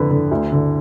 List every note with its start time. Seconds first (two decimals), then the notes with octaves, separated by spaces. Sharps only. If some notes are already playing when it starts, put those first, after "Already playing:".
Already playing: F2 D3 B4
0.11 D3
0.31 D2
0.52 D3